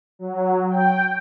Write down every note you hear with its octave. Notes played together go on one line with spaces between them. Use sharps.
F#3
G5